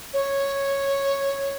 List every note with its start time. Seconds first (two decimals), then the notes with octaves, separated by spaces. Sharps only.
0.14 C#5